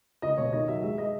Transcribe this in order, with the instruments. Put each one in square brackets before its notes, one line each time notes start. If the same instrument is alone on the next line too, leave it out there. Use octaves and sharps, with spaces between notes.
[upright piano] C#2 D#5
B2 C#5
D#3 D#5
F#3 E5
G#3 E5
D#5